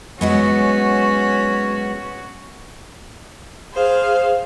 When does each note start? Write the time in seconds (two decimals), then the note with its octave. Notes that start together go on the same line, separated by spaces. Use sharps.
0.21 F#3 G#3 B3 C#4 F#4
3.73 G#4 C5 F5